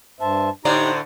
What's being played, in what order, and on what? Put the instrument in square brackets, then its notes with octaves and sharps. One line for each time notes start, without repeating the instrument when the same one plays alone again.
[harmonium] G2 C5 E5 [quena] A5
[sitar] A2 D3 D5 [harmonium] D#4 G4 [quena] C5 [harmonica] A#5